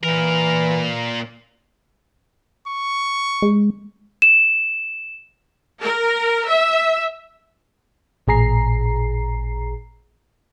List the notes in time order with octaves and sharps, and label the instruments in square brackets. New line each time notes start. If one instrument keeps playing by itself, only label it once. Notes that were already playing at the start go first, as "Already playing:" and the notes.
[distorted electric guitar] A#2 A#4 [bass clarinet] E3
[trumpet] C#6
[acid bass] G#3
[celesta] E7
[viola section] A#4
E5
[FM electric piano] A1 A#2 G#4 A#5 C7